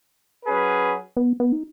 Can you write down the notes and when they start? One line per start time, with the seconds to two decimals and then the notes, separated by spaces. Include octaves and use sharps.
0.45 F#3 C#4 G#4 B4
1.17 B3
1.40 B3
1.52 D#4